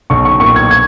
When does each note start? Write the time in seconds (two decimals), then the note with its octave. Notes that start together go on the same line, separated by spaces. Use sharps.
0.10 B1 C#6
0.25 C#6
0.40 A#2 C#6
0.56 G#6
0.71 G#6